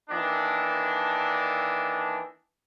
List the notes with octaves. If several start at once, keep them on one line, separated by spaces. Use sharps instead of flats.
D#3 E3 A#3 D4